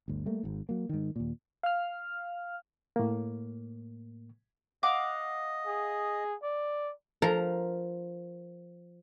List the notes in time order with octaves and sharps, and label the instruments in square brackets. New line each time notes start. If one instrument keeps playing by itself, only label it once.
[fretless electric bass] G1 D2
G3 A3 A#3
G#1 G#2
F#3 A#3
G#2 D#3
D#2 A#2
[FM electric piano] F5 F6
[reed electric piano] A2 A#3
[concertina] D#5 [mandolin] F5 F#5 D6
[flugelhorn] G#4
D5
[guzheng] F3 A#4 A#5